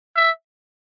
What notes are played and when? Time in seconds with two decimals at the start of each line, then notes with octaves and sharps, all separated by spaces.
0.16 E5